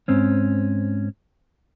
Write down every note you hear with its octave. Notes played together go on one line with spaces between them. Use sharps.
G#2 C4 C#4